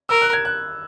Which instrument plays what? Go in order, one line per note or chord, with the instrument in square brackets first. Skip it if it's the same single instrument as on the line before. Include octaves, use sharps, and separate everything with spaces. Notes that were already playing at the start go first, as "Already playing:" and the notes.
[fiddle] A#4 [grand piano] E6
[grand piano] F#6
G#6
F#6